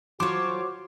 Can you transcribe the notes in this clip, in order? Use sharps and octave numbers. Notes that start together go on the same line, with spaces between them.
F#3 F4 F#4 A4 C5 C#5 D6